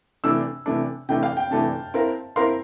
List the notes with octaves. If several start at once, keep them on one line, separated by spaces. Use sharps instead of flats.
C3 E3 A3 D4 E6
C3 E3 A3 D4
C3 E3 A3 D4 G5
F5
G5
C3 E3 A3 D4 A5
C4 E4 A#4 F5
C4 E4 A#4 F5 C6